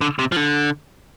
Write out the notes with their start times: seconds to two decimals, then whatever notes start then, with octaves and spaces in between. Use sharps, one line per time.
0.01 D3
0.19 C3
0.32 F3
0.37 D3